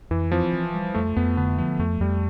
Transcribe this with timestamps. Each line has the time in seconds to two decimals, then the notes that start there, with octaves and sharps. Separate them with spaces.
0.11 F2 E3
0.32 F3 C4
0.53 E3
0.74 G3
0.95 F2 A3
1.16 F2 B3
1.37 D3 B3
1.59 F3 B3
1.79 F2 A3
2.00 F2 G3